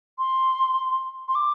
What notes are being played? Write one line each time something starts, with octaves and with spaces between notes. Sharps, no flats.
C6
C6
D6